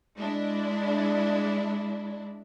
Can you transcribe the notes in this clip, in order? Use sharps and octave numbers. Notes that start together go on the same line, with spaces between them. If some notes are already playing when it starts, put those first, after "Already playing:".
G#3 D4 E4